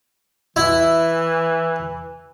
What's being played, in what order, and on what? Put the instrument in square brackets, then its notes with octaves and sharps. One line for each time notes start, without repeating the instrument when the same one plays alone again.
[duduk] E3 [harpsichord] E4